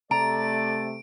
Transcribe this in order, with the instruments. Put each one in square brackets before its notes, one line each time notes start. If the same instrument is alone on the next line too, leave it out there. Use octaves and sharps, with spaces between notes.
[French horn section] C3 A3 [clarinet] D5 [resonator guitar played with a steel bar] A#5 [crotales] D7